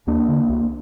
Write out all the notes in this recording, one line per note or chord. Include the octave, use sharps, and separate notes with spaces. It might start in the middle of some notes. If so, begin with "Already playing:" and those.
D#2 A#3 D4
D3
C2